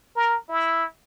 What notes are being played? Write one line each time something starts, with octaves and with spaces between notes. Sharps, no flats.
A#4
E4